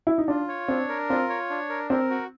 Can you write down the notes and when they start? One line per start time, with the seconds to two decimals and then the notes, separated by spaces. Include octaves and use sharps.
0.07 E4
0.18 D#4
0.28 D4 F4
0.48 C#5
0.68 C4 D4
0.89 A#4
1.10 C4 F4
1.30 C#5
1.50 D4
1.69 A#4
1.90 C4 A#4
2.10 F#4